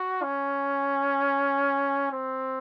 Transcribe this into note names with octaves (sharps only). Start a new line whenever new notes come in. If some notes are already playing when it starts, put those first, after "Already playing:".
Already playing: F#4
C#4
C4